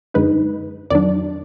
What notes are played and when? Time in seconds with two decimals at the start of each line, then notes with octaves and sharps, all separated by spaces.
0.14 F#2 D3 G#3 D#4 B4
0.90 F2 D#3 F#3 D4 D5